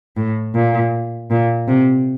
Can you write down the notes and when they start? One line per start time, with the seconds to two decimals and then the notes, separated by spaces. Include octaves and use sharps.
0.17 A2
0.55 A#2
1.31 A#2
1.68 C3